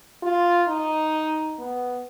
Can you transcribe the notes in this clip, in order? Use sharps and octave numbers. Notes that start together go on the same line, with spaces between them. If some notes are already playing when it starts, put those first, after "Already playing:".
F4
D#4
B3